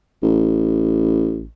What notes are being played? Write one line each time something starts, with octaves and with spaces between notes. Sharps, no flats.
A1